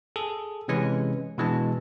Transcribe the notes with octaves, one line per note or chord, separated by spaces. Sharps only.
G#4 A4
C3 E3 G#3 C#4 B4
B2 E3 G#3 D4 A5